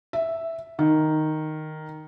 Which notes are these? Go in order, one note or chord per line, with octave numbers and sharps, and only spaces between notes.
E5
D#3